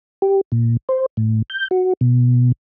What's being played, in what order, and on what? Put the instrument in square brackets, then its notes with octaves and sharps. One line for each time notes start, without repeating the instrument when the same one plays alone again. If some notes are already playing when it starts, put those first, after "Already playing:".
[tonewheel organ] G4
A#2
C5
A2
G6
F#4
B2